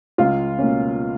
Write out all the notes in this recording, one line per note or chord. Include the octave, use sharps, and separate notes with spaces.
C#2 F4
B2 A#3 C#4